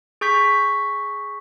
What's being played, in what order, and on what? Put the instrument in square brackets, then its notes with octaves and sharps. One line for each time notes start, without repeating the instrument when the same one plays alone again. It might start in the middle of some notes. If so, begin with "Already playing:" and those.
[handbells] G#4 C#6 G6 B6